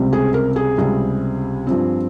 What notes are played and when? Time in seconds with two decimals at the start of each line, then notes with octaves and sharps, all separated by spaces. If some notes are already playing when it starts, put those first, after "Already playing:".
Already playing: C#2 C3 G3 C4
0.13 G#4
0.34 A#4
0.56 G#4
0.78 C#2 C3 G3 C4
1.67 G2 F3 C4